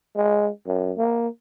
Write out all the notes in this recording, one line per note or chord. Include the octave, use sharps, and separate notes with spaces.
G#3
F#2
A#3